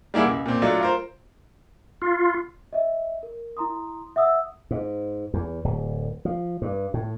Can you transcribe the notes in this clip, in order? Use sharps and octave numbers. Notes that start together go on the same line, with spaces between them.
G3 A#3 E4 G#4 F#5
C#2
A#2 C4
F#3 A3 D4 F4
F4 A#4 C5
F4
D#5 E5
A#4
E4 A#5 C6 D#6
E5 F#5 D#6 E6
G#2
E2
D1
F3
G2
A2